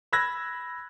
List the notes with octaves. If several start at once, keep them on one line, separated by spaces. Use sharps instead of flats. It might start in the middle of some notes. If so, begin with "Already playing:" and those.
B5 E6 F#6 G#6 A#6